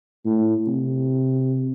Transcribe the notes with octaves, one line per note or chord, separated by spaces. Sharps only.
A2
C3